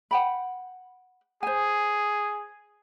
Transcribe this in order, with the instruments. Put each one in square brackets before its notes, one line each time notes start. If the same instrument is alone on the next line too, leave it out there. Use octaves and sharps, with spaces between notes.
[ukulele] F#5 G5 B5
[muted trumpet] G#4 [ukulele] C5 G#5